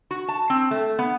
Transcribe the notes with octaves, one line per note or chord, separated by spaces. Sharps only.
F#4
A5
C4
A3
B3